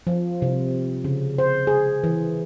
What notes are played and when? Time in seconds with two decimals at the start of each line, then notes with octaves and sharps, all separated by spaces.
0.07 F3
0.42 C3
1.04 C#3
1.38 C5
1.67 G#4
2.04 E3